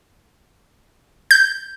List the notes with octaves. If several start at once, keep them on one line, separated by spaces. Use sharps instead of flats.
G6